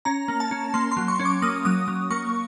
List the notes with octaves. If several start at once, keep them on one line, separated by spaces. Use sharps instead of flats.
C#4 A#5
A#3
A5
C#4
A#3 C6
C6
F#3
C#6
C#4
D6
A#3 D#6
F#3 D#6
F#3
A#3 C#6